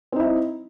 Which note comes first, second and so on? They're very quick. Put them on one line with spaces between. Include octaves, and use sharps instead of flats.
C4 D#4 E4